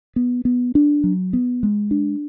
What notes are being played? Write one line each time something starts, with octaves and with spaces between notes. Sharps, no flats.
B3
B3
D4
F#3
B3
G#3
D4